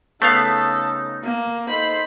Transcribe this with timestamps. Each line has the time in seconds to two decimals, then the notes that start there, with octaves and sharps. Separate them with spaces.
0.22 C#3 A3 B3 D#4 A4 F5
1.24 A#3
1.69 D#4 A4 C5 B5